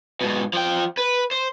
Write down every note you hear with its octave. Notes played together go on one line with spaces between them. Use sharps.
G#2 B2
F3 G5
B4
C5